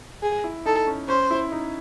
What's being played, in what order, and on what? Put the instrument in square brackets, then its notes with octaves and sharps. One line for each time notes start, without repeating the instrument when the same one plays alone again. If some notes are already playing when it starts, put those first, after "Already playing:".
[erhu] G#4
[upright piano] E4
[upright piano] D#4 [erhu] A4
[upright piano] C#4
[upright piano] C#4 [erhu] C5
[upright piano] E4
D#4